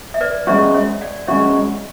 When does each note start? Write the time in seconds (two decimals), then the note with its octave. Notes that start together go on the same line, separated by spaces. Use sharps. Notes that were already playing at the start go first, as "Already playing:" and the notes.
0.14 E5
0.21 B4 D5
0.47 G#3 C#4 F#4 C#5 E5
0.74 C#5 E5
1.01 D5 F#5
1.27 G#3 C#4 F#4 C#5 E5